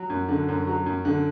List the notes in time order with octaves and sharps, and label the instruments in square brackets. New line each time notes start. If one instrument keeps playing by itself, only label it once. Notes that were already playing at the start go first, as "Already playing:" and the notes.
Already playing: [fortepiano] F#3
F#2
D3
F#2
F#3
F#2
D3